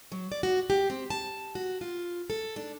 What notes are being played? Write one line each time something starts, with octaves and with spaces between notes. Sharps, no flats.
F#3
D5
F#4
G4
C4
A5
F#4
F4
A4
D4